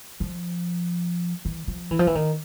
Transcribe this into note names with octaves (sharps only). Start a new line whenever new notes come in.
F3
E3
F3
E3
F3
E3
D#3